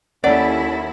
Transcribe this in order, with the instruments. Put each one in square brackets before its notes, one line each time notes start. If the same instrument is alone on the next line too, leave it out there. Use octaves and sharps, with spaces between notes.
[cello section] D#2 E4 [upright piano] C#4 A4 [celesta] C#5 F#5 [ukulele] D5